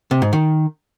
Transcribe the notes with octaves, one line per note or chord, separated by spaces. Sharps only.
C3
G#2
D#3